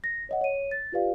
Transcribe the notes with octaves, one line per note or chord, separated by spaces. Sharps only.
A#6
C#5 D#5 F#5
C#5 D#7
A6
F4 G4 B4 D5 F5